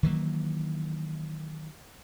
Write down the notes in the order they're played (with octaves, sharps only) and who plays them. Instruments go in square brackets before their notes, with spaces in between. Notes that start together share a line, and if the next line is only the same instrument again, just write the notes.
[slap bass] D#3 E3 F#3 A#3